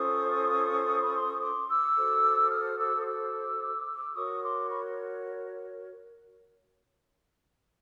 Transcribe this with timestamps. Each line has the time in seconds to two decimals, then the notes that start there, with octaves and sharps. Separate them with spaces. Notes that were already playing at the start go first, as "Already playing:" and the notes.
Already playing: C#4 F4 A4 C5 C#6 D#6
1.02 B5
1.14 C6
1.28 C#6
1.41 C6 D6
1.69 D6 E6
1.95 F#4 A4 C5
2.51 D#6 F6
2.79 D6 E6
3.01 D#6
3.05 D6 E6
4.15 F#4 A#4 C#5 C#6 D#6
4.42 C6 D6
4.69 B5 C#6